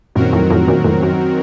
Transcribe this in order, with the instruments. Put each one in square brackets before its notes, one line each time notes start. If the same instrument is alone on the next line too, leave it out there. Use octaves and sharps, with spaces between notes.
[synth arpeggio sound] F#2 A#2 [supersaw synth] D#3 F#3 C4 F#4 A#4
[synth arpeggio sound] F2 A2
F2 A2
F#2 A#2
F2 A2
F#2